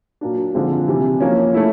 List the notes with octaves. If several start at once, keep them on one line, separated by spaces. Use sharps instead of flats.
A#2 F#3 A#3 D4
D3 F3 G#3 C4 F4
C3 E3 G3
F3 A#3 C#4
A3 C#4 E4